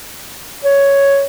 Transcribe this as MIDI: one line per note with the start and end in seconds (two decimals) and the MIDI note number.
0.65 1.27 73